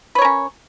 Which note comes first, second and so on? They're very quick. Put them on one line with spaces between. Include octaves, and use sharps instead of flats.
B4 C#5 A#4 C#4